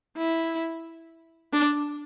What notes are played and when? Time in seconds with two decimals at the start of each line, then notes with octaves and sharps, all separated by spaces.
0.17 E4
1.53 D4